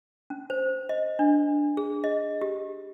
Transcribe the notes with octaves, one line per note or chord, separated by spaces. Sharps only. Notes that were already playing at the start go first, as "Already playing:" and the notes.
C#4
C5
D#5
D4
G#4
D#5
G4